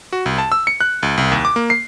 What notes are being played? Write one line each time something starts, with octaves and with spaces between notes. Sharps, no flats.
F#4
C2
A5
E6
C#7
F#6
C#2
C2
D#2
D6
A#3
C7